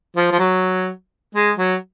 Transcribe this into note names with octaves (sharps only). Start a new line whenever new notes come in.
F3
F3
F#3
G#3
F#3